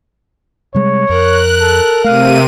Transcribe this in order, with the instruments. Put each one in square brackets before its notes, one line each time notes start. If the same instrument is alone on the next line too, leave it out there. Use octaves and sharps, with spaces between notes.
[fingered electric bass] C3 G3 G#3 [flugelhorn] C#5
[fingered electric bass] F2 [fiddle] A#4 [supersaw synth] F#6
[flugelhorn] A4
[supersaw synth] C3 D#7 [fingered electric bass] A3 [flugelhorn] F5